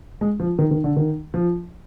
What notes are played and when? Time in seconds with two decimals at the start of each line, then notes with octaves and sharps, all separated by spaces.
0.21 G#3
0.40 F3
0.59 D#3
0.71 D#3
0.84 D3
0.96 D#3
1.34 F3